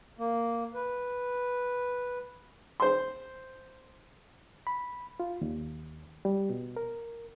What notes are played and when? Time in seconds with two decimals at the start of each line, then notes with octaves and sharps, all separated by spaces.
0.19 A#3
0.74 B4
2.80 C5 C6
4.67 B5
5.20 F4
5.41 D#2
6.25 G3
6.50 B2
6.77 A#4